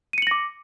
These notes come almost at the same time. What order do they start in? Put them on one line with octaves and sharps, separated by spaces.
D#7 C#7 F#7 A#6 D6